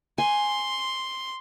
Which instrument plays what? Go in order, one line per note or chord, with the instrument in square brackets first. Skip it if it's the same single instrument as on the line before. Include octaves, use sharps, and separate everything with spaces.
[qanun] G#5 [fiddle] C6